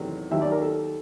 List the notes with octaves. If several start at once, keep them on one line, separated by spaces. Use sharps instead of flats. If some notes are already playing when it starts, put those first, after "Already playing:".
Already playing: E2 C3 D#3 F#3 A3
D#2 D#3 F#3 E5
D5
A#4
A4